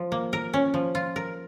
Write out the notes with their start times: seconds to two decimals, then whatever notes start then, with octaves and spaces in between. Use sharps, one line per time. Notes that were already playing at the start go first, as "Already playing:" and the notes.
Already playing: F3
0.12 A#3
0.33 A#4
0.54 C#4
0.74 F3
0.95 F4
1.16 A#4